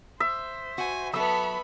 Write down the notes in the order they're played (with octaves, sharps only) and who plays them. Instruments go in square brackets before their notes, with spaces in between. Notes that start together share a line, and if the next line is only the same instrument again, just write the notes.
[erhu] C5 [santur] E5
[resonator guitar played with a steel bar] F#4 [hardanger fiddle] G#5
[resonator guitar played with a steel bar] F#3 A4 [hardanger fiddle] B3 E5 [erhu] B5 [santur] E6